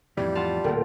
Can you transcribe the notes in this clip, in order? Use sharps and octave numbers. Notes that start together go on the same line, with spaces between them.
F2 A2 E3 G3
F4 F#5 A5
D1 A#2 A4 A#4 G5